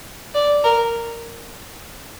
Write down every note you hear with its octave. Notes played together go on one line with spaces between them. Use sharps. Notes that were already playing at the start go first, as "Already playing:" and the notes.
D5
A#4